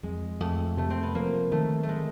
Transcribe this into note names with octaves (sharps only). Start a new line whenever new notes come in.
F2 G#3
F2 A3
C3 A3
C4
B3
F3 A#3
D#3 A3
A3
G#3